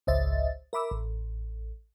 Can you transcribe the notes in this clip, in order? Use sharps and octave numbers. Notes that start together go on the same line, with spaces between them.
G#1 C#2 C5 D#5 E5 A6
A#4 E5 B5 D6 E6
A1